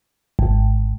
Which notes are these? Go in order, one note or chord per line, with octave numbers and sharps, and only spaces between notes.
G#1